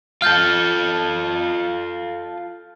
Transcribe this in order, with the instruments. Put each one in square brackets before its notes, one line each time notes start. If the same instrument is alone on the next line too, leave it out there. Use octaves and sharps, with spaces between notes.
[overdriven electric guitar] F4 A4 [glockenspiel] F6 G6 A6